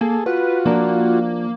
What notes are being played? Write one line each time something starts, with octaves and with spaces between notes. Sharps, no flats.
A#3 G#4 A4
F4 F#4 B4
F3 A#3 D4 A#4